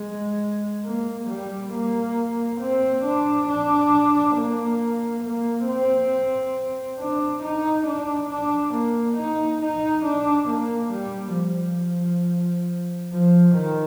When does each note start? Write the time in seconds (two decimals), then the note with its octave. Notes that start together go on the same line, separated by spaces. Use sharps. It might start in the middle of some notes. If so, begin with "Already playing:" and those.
Already playing: G#3
0.85 A#3
1.30 G3
1.73 A#3
2.61 C4
3.04 D4
3.48 D4
4.36 A#3
5.24 A#3
5.67 C4
6.99 D4
7.43 D#4
7.87 D4
8.30 D4
8.74 A#3
9.18 D#4
9.62 D#4
10.06 D4
10.49 A#3
10.93 G3
11.37 F3
13.12 F3
13.56 D#3